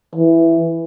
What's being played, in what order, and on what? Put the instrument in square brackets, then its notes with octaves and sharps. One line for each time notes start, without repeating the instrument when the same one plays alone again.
[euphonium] E3